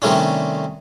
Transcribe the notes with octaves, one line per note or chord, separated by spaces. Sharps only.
C3 D#3 G3 A3 C#4 D4